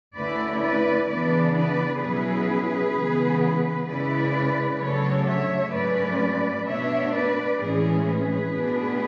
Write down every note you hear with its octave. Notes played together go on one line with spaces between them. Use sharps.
D2 D3 A3 C#4 E4 B4 D5
B4 D5
C#3 E3 B3 D4 B4 D5
B4 D5
B2 F#3 C#4 E4 G#4 B4
C#3 E3 G#3 B3
C#3 G#3 C#4 E4 B4 D5
C#3 F#3 A3 D4 A4 C#5
C#5 E5
G#2 F#3 A3 C#4 B4 D5
B2 A3 D4 C#5 E5
B4 D5
A2 E3 G#3 C#4 G#4
G#4 B4
B2 A3 D4